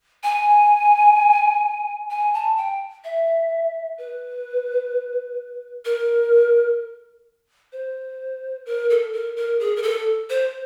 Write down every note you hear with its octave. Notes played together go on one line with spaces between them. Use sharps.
G#5
G#5
A5
G5
E5
B4
A#4
C5
A#4
A4
A#4
A#4
G#4
A#4
A4
C5